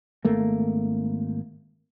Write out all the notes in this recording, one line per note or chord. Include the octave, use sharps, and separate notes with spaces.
G#1 A3 A#3